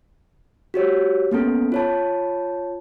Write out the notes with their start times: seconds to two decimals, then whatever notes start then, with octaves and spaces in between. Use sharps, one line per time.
0.74 F#4 G4 C#5
1.32 A#3 B3 C#4 A4
1.72 F4 C#5 A5